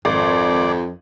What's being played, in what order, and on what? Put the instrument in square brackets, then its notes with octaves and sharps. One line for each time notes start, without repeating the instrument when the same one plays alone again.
[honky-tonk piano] G#1 [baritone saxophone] F2 [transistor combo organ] D5